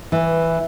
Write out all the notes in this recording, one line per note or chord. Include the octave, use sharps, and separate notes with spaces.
E3